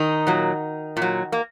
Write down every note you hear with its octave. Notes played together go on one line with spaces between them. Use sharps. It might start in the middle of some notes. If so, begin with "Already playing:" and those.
Already playing: D#3 D#4
A#2 F#3
A#2
F#3
A#3